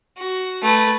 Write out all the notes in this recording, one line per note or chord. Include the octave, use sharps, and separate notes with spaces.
F#4
A3 B4